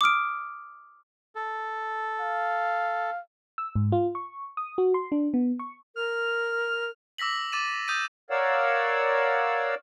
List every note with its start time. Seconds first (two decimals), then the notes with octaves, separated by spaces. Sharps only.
0.01 D6 D#6 F6 D7
1.35 A4
2.21 F5
3.58 E6
3.76 G#2
3.92 F4
4.15 C#6
4.57 D#6
4.78 F#4
4.94 C6
5.12 D4
5.34 B3
5.59 C#6
5.96 A#4 F6
7.18 D6 E6 A#6 B6 F#7
7.52 D6 A6 D#7 E7
7.88 D#6 G6 A6 A#6 D#7
8.30 A#4 C#5 D5 F5 F#5 E6